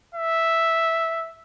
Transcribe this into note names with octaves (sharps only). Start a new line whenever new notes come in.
E5